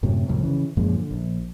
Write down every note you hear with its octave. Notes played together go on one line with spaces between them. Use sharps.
F#2 A2 C3 F#3
C2 F2 A2
C#3 E3
F#2 A#2 F3 G#3
D3
A#1